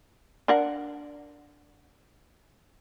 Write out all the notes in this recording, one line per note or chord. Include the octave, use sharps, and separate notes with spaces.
D4 A#4 F#5